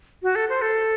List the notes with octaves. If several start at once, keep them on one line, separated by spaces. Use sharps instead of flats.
F#4
A4
C5
A4